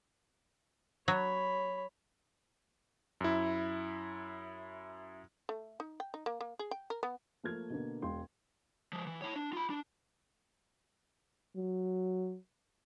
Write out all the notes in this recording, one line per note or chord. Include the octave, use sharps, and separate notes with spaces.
F#3 C#5 B5
F#2 E4
A3
D#4
G5
D#4
A#3
A#3
G#4
G5
A#4
B3
F3 A3 A#3 F6 G#6
B2 D3 A#3
E1 G#3 F5 G5 C6
F3 G#3
E3
E4 C#5
D4
F4 B5
D4
F#3